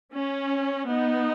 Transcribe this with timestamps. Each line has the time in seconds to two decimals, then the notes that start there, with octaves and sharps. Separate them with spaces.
0.13 C#4
0.89 B3 D#4